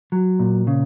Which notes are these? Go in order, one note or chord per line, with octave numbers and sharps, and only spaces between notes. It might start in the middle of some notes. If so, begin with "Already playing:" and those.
F#3
A#2
C#3